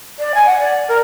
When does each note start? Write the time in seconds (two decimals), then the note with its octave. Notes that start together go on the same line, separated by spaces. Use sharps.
0.19 D5
0.35 G#5
0.46 F#5
0.60 D5
0.88 A#4